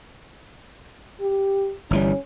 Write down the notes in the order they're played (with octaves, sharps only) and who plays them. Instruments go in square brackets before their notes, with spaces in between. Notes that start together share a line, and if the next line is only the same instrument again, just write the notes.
[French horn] G4
[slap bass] G1 E3 G3 [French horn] C#4